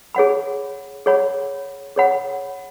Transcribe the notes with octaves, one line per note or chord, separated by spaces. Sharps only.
G#4 C#5 F#5 B5
G#4 C#5 F#5 B5
G#4 C#5 F#5 B5